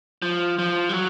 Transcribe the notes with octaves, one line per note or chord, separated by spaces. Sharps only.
F3
F3
G3
F#3